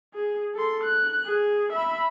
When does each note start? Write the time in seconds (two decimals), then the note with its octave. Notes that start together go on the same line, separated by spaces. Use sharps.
0.14 G#4
0.54 A4 C6
0.84 F#6
1.25 G#4
1.72 E5 B5